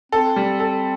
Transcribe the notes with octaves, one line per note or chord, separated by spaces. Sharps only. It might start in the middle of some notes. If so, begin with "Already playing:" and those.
C4 A4
G3
A4